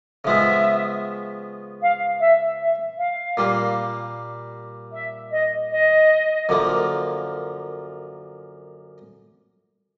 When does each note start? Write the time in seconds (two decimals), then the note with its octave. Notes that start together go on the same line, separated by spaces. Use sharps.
0.25 C#3 F3 G#3 B3 E5
1.81 F5
2.20 E5
2.59 E5
2.98 F5
3.37 A#2 G3 A#3
4.93 E5
5.31 D#5
5.70 D#5
6.49 F#2 D3 F3 A#3